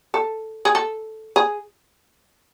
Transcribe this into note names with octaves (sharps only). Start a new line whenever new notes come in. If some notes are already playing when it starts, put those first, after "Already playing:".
A4
G#4
A4
G#4